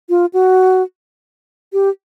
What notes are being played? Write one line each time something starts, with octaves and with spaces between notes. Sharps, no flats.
F4
F#4
G4